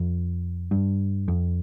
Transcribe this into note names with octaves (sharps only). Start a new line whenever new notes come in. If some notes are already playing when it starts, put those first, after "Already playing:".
Already playing: F2
G2
F2